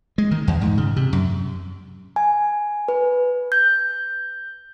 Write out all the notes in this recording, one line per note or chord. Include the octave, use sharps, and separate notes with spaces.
G#3
D#3
E2
G#2
C#3
C3
F#2
G#5
B4
G6